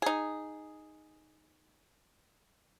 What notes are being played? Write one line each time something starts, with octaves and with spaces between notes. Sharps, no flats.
D#4 G#4